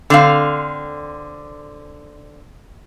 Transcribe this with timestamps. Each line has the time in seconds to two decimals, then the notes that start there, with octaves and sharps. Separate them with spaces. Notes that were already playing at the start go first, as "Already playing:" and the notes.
0.10 D3 C4 F5